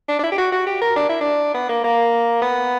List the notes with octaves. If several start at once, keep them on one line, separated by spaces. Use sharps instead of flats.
D4
D4
E4
G4
F#4
F#4
G4
A#4
D4
E4
D4
B3
A#3
A#3
B3